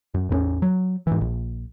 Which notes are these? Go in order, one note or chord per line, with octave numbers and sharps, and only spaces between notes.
F#2
A1 E2 B3 C#4
F#3
G#2 E3
A#1